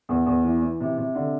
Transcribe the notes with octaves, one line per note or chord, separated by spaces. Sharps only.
E2
E2
E3
E3
C3
C3
D3